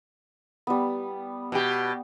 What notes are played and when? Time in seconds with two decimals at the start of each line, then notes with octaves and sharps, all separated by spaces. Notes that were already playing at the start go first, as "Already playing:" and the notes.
0.67 G3 B3
1.52 B2 G4